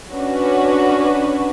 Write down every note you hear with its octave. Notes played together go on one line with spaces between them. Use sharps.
C#4 D4 F#4 B4